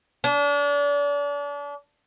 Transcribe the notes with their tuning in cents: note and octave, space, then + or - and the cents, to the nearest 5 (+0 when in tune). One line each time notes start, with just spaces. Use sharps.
D4 -35